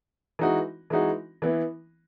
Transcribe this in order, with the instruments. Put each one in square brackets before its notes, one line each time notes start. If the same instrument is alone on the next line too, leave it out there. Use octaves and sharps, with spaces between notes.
[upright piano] E3 G#3 D#4 F#4
E3 G#3 D#4 F#4
E3 B3 E4